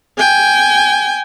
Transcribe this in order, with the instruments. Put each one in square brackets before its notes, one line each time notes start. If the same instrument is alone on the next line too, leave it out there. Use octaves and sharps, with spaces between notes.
[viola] G5 G#5